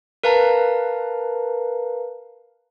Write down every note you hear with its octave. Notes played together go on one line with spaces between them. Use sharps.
A#4 B4 F5 A5 A#5